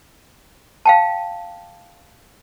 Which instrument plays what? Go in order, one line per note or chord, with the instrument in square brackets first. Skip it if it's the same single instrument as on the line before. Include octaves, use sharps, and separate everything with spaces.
[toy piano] F5 G5 A5